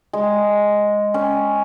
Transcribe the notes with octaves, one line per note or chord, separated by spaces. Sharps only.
G#3
C#4